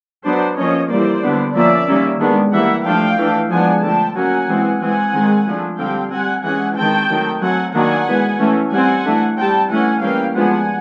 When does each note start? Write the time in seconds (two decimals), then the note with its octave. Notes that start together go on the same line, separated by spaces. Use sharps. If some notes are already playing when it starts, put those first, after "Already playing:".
0.24 F#3 B3 D4 C5 D5
0.57 F3 A#3 C#4 C#5 D#5
0.90 E3 G3 A#3 C5 D5
1.23 D3 G3 B3 D4
1.55 F3 A#3 C#4 D5 E5
1.88 D#3 G3 A#3 C#4
2.21 D#3 G#3 B3 D4
2.53 E3 G3 A#3 E5 F#5
2.85 F3 A3 D4 F5 G5
3.18 E3 A3 D4
3.50 F3 G#3 B3 D4 F#5 G#5
3.83 D3 F3 A3 G5 A5
4.16 F#3 A#3 C#4 F#5 G#5
4.49 E3 G#3 C4
4.81 E3 G#3 C4 F#5 G#5
5.14 D#3 G#3 C4
5.47 F3 A3 D4
5.79 D3 G3 C4 F5 G5
6.12 G3 C4 F#5 G#5
6.44 E3 G#3 C#4 F#5 G#5
6.77 D#3 G#3 C4 G5 A5
7.09 D#3 F#3 A3
7.42 F#3 A3 C4 F#5 G#5
7.74 D#3 F#3 A#3 D4 F#5 G#5
8.08 E3 G#3 B3
8.39 E3 A3 C#4
8.72 G3 C4 F#5 G#5
9.05 E3 A3 D4
9.37 G3 C4 G5 A5
9.70 E3 A3 C#4 F#5 G#5
10.02 E3 G3 A#3 C#4 F5 G5
10.35 F3 G#3 B3 D4 F#5 G#5